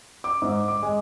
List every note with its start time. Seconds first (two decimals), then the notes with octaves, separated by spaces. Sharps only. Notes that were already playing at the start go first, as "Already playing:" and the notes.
0.24 D6
0.42 G#2
0.68 D6
0.83 G#3